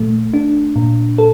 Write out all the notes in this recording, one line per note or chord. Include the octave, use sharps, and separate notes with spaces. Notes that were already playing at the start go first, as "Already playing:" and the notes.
Already playing: A#2 A3
D4
A#2
A4